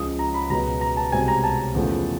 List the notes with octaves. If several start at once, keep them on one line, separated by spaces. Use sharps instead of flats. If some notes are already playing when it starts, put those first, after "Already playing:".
Already playing: C#2 C#3 F3 D#6
A#5
B5
C#2 B2 F#3 B3 A#5
A#5
A5
C2 B2 G#3 C4 G#5
A#5
A5
E2 C#3 F3 A3